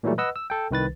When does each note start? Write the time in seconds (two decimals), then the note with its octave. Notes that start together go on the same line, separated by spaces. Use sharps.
0.03 A#2 E3 F#3 G3 A3
0.18 B4 D#5 F#5 E6
0.36 E6
0.50 A4 G5
0.71 C2 D#3 B4 A6